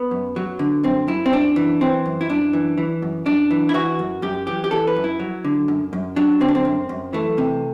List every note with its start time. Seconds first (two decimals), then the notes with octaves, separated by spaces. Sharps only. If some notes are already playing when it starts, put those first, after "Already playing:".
Already playing: B3
0.11 F#2
0.36 F#3
0.59 D3
0.83 F#2 C4
1.08 F#2 E4
1.26 C4
1.32 F#2 D4
1.56 E3
1.81 E3 C4
2.06 F#2
2.21 E4
2.29 F#2 D4
2.53 E3
2.78 E3
3.02 F#2
3.26 F#2 D4
3.51 E3
3.69 E4
3.74 E3 F#4
3.99 F#2
4.22 F#2 G4
4.47 E3 G4
4.64 G4
4.71 E3 A4
4.87 B4
4.96 F#2
5.04 E4
5.20 F#3
5.44 D3
5.68 F#2
5.93 F#2
6.16 F#3 D4
6.41 D3 C4
6.49 D4
6.55 C4
6.65 F#2
6.89 F#2
7.13 E3 A3
7.38 C3